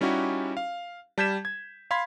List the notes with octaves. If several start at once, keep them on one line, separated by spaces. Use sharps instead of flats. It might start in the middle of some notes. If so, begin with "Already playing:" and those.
G3 C#4 D#4 E4 F#4 G4
F5
G3 A5 G6 G#6 B6 E7
G#6
F5 B5 C6 G#6 B6